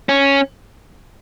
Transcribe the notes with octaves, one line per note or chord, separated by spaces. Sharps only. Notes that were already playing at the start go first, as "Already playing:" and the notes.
C#4